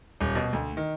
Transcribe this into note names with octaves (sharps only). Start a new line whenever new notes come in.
D#1
B2
D2
D#3